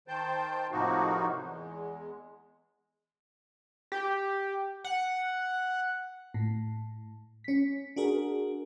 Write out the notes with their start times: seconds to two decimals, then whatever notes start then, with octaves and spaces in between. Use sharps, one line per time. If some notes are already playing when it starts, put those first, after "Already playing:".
0.08 D#3 C5 G5 A5 G6
0.71 A2 C3 F3 A#3 D#4 F#4
1.38 E2 G#3
3.92 G4
4.84 F#5
6.34 A2
7.44 C#4 B6
7.96 D4 F#4 G#4 A#4